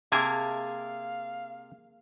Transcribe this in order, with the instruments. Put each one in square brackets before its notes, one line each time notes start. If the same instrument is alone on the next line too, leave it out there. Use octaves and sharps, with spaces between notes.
[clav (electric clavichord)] C3 [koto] A#3 G#4 E5 [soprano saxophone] F5 [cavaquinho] A5